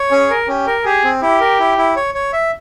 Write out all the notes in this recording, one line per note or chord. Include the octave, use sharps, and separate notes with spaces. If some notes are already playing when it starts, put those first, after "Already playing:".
Already playing: C#5
C#4 G#4
A#4
C#4 G4
A#4
G4 G#4
C4
E4 G4
A#4
E4
E4
C#5
C#5
E5